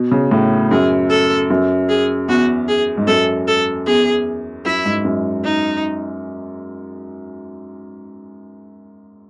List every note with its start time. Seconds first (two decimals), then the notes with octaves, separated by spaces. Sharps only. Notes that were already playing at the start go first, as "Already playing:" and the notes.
Already playing: B2
0.11 C#3
0.31 A2
0.71 F#2 G#4
1.10 A4
1.50 F#2
1.89 G#4
2.28 E2 F#4
2.68 G#4
2.97 G#2
3.07 F#2 A4
3.48 A4
3.87 E2 G#4
4.65 F#2 E4
4.85 G#2
5.05 F#2
5.44 D#4